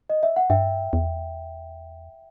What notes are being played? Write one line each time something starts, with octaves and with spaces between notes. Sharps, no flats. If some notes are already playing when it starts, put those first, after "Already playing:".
D#5
E5
F#5
G2 E5 G5
E2